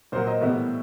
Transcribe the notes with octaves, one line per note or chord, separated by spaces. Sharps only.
A#2 F#3 A#3 C5
D#5
A2 E3 G3 B3 E5